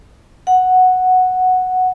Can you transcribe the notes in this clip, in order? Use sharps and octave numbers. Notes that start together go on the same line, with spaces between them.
F#5